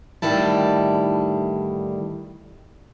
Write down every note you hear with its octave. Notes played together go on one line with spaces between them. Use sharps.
A2 D3 D#3 G3 E4 A5